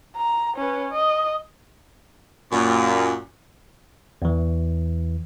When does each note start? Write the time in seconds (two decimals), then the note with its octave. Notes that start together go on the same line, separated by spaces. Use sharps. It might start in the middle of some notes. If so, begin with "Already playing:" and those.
0.17 A#5
0.56 C#4 B4
0.92 D#5
2.52 F#2 A#2
4.22 E2 E3